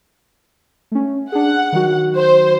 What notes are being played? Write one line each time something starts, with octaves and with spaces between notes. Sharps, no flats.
A3 C#4
D4 G#4 F#5
D#3 F#3 F#4
C5